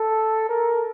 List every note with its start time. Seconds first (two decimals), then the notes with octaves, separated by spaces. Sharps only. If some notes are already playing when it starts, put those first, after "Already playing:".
Already playing: A4
0.49 A#4